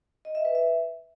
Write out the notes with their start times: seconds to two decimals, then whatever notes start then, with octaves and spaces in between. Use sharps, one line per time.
0.25 D#5
0.35 E5
0.45 B4
0.55 E5